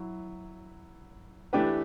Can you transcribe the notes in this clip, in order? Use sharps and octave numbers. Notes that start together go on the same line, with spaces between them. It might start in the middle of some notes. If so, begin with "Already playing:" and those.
Already playing: F#3 E4
E3 A3 D4 G4 B4